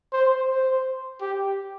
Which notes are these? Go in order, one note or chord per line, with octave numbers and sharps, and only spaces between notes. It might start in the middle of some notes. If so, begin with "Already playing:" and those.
C5
C5
G4